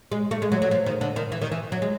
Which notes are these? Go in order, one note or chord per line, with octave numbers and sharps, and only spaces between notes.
G#3
A3
G#3
F#3
F#3
F3
D#3
D3
D#3
E3
D#3
E3
F#3
G#3